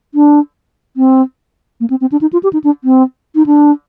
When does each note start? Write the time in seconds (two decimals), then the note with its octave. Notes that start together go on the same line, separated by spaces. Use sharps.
0.15 D4
0.97 C4
1.80 A#3
1.90 C4
2.01 C4
2.12 D4
2.21 D#4
2.33 F4
2.43 G4
2.53 D#4
2.64 D4
2.84 C4
3.35 D#4
3.46 D4